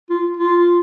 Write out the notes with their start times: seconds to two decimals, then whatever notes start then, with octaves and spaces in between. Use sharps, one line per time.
0.10 F4
0.37 F4